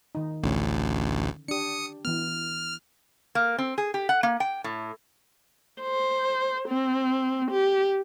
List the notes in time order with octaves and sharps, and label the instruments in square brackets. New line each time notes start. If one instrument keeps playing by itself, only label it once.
[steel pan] D#3 D#4
[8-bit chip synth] A1 D2 [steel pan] D3 C#4
[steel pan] D4 G4 [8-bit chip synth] D#6 C#7
[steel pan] E3 B3 [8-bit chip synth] F6
[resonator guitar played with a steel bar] A#3
C4
G#4
G4
F#5
A#3
G5
A2
[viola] C5
C4
G4